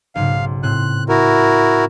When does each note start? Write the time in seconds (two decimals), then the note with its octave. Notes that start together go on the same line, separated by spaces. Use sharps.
0.15 B1 G#2 C#3 F5
0.63 A2 C4 F#6
1.09 E4 F#4 A#4